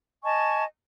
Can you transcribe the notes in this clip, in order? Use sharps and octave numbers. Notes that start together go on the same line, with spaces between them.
D#5 G#5 A5 C#6